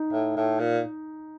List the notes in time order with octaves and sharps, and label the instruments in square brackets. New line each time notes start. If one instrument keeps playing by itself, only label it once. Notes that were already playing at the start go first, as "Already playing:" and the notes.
Already playing: [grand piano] D#4
[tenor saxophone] A2
A2
A#2